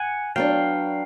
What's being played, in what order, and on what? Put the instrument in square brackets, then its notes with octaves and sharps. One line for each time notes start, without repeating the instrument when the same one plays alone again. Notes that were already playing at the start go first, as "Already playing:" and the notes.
Already playing: [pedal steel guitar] F#5 G#5
[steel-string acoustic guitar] F#3 B3 D4 [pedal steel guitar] F5 G5